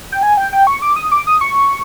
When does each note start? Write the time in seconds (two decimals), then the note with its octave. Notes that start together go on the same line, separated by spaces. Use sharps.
0.12 G5
0.23 G#5
0.37 G5
0.53 G5
0.67 C#6
0.82 D6
0.96 D#6
1.12 D6
1.27 D#6
1.41 C#6